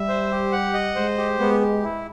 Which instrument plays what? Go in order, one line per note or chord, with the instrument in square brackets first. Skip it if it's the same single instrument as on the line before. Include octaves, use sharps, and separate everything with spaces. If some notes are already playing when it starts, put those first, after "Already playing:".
Already playing: [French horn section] G3 [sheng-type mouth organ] E5
[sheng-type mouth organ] C5
G4
F#5
D#5
[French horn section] G#3 [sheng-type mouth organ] C5
[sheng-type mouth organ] G4
[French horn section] G#3 [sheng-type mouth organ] B3
[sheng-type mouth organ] G4
E4